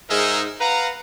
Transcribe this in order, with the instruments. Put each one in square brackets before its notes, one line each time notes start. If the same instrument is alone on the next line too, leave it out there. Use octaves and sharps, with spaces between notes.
[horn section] G#2 D#4 G#4 A#4 E5
B4 F5 F#5 A#5